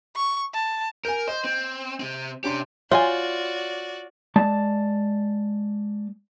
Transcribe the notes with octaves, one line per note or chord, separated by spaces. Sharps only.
C#6
A5
A#4 G#5 G6
C5 D#5
C4
C3 C4
C3 C#4 D4 G4 C6
F4 F#4 C#5 D5 E5 F#5 G#5
G#3 D5 A5